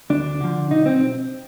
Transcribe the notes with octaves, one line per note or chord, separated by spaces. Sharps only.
D2 D4
D3 F3
B1 D#4
C4